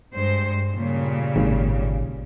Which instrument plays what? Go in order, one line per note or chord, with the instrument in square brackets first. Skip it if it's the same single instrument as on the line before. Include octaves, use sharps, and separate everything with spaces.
[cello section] G2 G#3 C5
A#2 C#3 G3
[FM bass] G#1